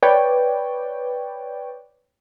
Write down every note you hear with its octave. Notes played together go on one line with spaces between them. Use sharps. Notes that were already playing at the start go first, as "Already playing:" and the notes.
B4 C#5 D5 G5